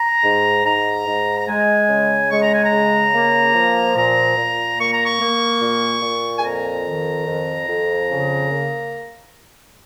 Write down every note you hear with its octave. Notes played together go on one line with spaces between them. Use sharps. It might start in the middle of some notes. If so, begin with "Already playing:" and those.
Already playing: A#5
G#2
G#2 A#5
G#2
A#5
G#3 G#5
C#3
G#3 C#6
A#5
G#5
A#5
C#3
A#3
F3
A#2 A#5
A#2
A#3 C#6
A#5
C#6
A#3
A#2
A#2
G#5
F2 A#5
D#3
F2
F2
C#3
A#3